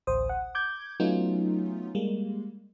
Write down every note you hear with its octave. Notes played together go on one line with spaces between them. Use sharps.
A1 D2 C5 D#6
F#5
D6 G6 G#6
F#3 A3 B3 C#4 D#4 F4
G3 G#3 A#3